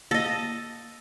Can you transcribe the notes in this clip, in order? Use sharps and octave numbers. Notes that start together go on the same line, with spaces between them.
A#3 A4 D#5